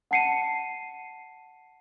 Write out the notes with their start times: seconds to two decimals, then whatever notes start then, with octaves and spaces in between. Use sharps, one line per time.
0.11 F#5 A5 C7 C#7 D#7